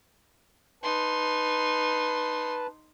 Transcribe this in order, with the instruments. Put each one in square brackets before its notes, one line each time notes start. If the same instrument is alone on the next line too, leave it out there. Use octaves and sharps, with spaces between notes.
[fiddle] D#4 C6 [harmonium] B4 A5